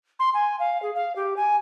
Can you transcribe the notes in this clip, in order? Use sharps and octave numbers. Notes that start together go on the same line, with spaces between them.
C6
G#5
F5
G#4
F5
G4
G#5